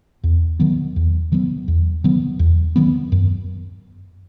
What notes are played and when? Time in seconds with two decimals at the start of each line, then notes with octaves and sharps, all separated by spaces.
0.24 E2
0.59 D#3 F#3 B3
0.96 E2
1.32 D#3 F#3 B3
1.68 E2
2.04 D#3 F#3 B3
2.39 E2
2.76 D#3 F#3 B3
3.12 F#2